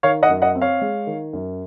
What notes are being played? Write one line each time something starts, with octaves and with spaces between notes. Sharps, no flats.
D#3 C#5 F5
D#5 F#5
F#2
D#5 F#5
C4
C#5 F5
G#3
D#3
F#2